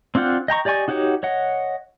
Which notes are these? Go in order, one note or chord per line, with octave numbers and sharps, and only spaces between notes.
C4 D4 F4 F#5 G5
D#5 G5 A#5 C#6
G4 D5 D#5 G#5 C#6
D#4 F#4 G4 C#5 F#5
C#5 D#5 F#5